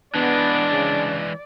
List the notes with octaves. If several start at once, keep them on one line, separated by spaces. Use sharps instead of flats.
E3 G#3 B3 D4 D5
C#3